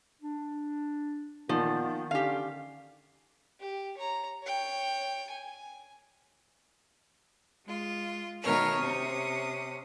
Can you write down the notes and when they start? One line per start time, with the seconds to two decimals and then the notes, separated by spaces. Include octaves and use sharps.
0.22 D4
1.49 A#2 D#3 F3 B3
2.11 D3 C#4 G4 F5
3.60 G4
3.98 C#5 A#5
4.43 C#5 G5
5.30 G#5
7.65 G#3 F4
8.42 B2 D#3 A3 A#4 C#5 F6
8.77 C3 C#4 D#6